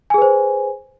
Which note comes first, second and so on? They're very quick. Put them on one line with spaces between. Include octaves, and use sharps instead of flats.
G#5 G#4 B4 C5